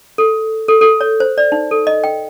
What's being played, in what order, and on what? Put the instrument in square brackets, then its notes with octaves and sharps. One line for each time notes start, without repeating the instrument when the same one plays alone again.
[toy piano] A4
A4
A4
C#5
C5
D5
D#4
A4
D#5
G5